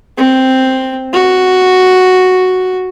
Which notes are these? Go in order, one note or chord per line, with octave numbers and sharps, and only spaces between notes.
C4
F#4